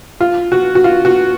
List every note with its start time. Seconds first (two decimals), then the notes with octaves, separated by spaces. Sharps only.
0.20 F4
0.52 F#4
0.75 F#4
0.84 F4
1.05 F#4